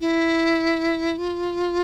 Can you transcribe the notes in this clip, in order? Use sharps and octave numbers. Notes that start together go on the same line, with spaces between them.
E4
F4